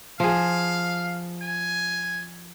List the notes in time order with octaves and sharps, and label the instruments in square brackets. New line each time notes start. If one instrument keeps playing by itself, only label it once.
[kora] F3 G#4 [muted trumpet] F5
[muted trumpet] G#5